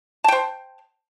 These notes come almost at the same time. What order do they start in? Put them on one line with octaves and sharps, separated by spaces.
A5 G5 C5